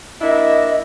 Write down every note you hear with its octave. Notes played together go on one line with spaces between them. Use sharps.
A#3 D4 E4 D#5